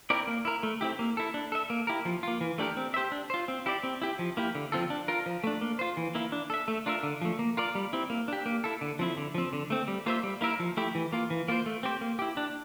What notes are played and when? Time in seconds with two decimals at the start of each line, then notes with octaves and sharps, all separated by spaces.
0.10 C4 E4 A#4 D5
0.27 A#3
0.45 E4 A#4
0.63 A3
0.81 C4 E4 G4
0.99 A#3
1.17 E4 A4
1.34 D4
1.52 A4 E5
1.70 A#3
1.87 E4 G4 A#4
2.05 F3
2.23 A#3 F4
2.41 E3
2.58 A3 D4 G4 A#4
2.77 C4
2.94 G4 C5 E5
3.12 D4
3.30 F4 C5
3.48 C4
3.66 E4 G4 D5
3.83 C4
4.02 E4 G4
4.19 F3
4.37 A#3 E4 G4
4.55 D3
4.72 F3 C4 F4 A4
4.90 D4
5.08 F4 A#4
5.26 F3
5.44 A3 D4
5.61 A#3
5.79 F4 C5
5.97 E3
6.15 A#3 E4
6.32 D4
6.50 A4 E5
6.68 A3
6.86 D4 F4 A#4 E5
7.03 D3
7.22 F3 A3
7.39 A#3
7.57 F4 A#4 D5
7.75 G3
7.93 C4 E4
8.10 A#3
8.28 D4 G4
8.46 A#3
8.64 E4 A4
8.81 D3
8.99 F3 C4 E4
9.17 D3
9.35 F3 C4
9.53 D3
9.70 A3 C4
9.88 G3
10.06 A#3 F4 C5 E5
10.23 G3
10.41 A#3 E4 A#4 E5
10.60 F3
10.77 A3 E4 G4
10.95 E3
11.12 A#3 F4
11.30 E3
11.48 A#3 F4 C5
11.66 A3
11.83 C4 G4 C5
12.01 A#3
12.19 E4 G4
12.37 D4